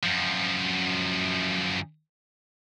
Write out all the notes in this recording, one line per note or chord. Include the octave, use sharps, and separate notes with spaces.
F#2 F3